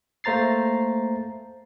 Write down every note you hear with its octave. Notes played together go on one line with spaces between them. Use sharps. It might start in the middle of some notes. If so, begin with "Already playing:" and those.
A3 A#3 C5 A#5 A6 C7